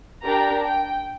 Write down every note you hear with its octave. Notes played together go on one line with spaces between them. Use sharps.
D4 G4 A#4 G5 A#5
G5